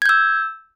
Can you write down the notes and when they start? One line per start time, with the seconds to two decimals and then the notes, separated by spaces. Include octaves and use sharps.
0.02 G#6
0.06 G6
0.09 E6